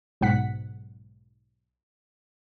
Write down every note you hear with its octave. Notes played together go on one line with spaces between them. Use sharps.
B1 G#2 F#5 B6